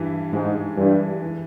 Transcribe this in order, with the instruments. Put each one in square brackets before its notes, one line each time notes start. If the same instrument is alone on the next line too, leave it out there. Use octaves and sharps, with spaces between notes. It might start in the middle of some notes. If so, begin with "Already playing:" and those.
Already playing: [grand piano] G2 E3
[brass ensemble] G#2 [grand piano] G#3
[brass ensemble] G2 [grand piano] E3
[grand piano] E3